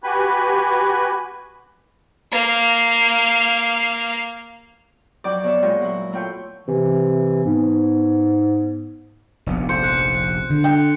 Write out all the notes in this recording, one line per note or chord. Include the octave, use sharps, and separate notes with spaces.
F#4 G4 B4 G#5 B5
A#3 F5
F2 F#3 D5 G5 D6
B2 C#5 E5
A#2 G#3 F4 C#5 G5
F#3 E4
A3 E4 F4 C#5 G5
C3 E3
G#2 B3
F1 A#1 B3
C5 C#7
F#6 C#7
D3
G5